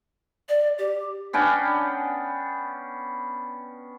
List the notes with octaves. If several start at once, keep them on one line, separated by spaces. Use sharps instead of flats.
D5
G4
B3 C#4 D4 G5